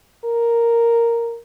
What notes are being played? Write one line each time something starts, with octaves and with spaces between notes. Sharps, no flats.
A#4